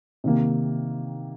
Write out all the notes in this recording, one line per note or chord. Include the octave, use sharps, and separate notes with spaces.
C3 D#3 A#3